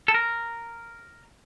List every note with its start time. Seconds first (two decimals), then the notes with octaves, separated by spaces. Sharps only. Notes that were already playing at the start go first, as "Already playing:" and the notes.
0.08 A4
0.14 A#4